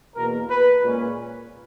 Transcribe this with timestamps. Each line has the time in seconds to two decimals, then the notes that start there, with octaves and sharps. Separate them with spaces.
0.15 E2 B2 A#3 A#4
0.48 B4
0.82 A#2 G#3 C#4